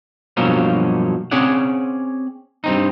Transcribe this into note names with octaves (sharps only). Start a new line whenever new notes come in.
G2 B2 F3 F#3 A#3 C#4
C4 C#4 G#4 C#5 D5 F#5
G2 C4 D#4